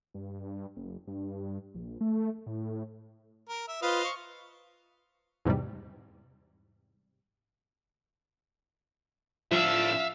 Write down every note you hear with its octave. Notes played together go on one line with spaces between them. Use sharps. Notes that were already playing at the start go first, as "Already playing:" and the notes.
G2
F#1
G2
A#1
A3
A2
A#4
E5
F4 B4 C5 D#5 F5
C#6
E2 G#2 C3 G3
A2 F3 D4 E5 F5 E6